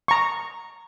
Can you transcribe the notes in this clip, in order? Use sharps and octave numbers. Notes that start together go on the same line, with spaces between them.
A#5 C#6